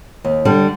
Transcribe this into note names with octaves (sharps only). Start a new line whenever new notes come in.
D#2
D3 G3